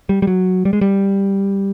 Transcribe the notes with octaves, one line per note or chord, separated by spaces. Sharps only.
G3
G3
F#3
G3
G#3
G3